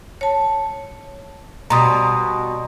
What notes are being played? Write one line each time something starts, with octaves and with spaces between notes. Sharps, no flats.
C#5 A5
B2 G3 A#5 C6 D#6